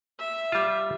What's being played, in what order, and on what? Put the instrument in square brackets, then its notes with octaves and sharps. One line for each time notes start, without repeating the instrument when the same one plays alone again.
[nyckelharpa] E5
[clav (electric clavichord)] G3 F4